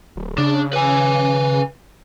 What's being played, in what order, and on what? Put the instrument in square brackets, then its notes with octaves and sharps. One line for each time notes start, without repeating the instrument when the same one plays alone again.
[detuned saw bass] D1
[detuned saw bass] C#3 [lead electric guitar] D4
[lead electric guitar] B4 G#5